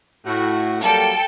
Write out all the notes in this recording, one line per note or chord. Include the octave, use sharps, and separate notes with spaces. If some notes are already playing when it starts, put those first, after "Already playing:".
A2 F#4
F#3 G3 A#3 A4 G5